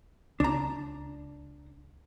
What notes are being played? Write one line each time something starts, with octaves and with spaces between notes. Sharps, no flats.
C#2 D4 A#5